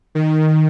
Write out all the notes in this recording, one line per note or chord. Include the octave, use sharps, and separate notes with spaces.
D#3